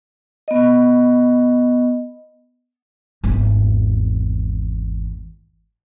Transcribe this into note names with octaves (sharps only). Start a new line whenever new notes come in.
B3 D#5
G#1 E2